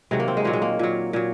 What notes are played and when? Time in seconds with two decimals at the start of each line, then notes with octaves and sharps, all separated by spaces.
0.11 C3 D#3 F#3 G#3
0.20 A#3
0.28 C4
0.37 G#3
0.44 A#2 F#3 A#3
0.53 G#3
0.62 A#3
0.79 A#2 F#3
1.13 A#2 F#3